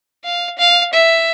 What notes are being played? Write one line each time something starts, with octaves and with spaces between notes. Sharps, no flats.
F5
F5
E5